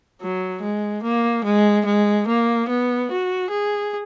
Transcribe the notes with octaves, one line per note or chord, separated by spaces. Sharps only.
F#3
G#3
A#3
G#3
G#3
A#3
B3
F#4
G#4